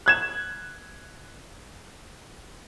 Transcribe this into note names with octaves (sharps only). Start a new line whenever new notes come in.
F#6 G#6 E7